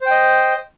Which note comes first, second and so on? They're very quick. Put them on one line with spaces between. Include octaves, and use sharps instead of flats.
C5 G5 D#5